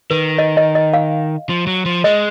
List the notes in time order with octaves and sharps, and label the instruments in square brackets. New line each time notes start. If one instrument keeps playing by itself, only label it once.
[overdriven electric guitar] D#3 [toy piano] B4
[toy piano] D#5
D#5
D#5
F5
[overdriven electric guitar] F3
F#3
F3
[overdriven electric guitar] G#3 [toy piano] D#5